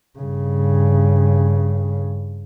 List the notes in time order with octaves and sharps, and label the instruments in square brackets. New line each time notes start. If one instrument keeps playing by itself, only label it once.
[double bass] G2 C#3